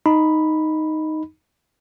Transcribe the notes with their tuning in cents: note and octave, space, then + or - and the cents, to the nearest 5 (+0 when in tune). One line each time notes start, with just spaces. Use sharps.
D#4 +0 B5 +0